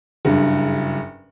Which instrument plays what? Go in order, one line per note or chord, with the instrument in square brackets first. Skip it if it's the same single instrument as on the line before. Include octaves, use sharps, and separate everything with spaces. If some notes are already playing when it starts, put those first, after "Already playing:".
[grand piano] F#1 G2